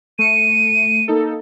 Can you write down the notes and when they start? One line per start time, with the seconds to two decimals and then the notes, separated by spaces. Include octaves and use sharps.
0.19 A3 C#7 D#7
1.08 A#3 D#4 A4